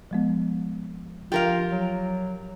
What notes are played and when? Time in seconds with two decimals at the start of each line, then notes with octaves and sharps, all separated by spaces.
0.11 F3 G#3 B3
1.32 F3 F4 G4 A#4 F5
1.72 F#3